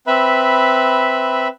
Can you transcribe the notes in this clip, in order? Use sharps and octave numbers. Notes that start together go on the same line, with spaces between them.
C4 B4 E5 B5